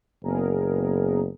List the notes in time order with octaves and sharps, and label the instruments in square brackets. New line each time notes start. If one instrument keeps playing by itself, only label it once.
[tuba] F#1 [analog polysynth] B3 G#4 A#4